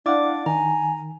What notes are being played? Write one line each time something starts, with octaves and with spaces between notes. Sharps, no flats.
D4 E4 D5 F5 F#5 D6
D#3 G#5 A#5